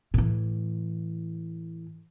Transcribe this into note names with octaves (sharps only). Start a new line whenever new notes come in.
A2 E3